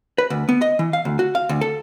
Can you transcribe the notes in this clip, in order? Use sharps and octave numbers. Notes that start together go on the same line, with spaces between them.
B4
D2
B3
D#5
E3
F5
D2
F#4
F5
D2
A4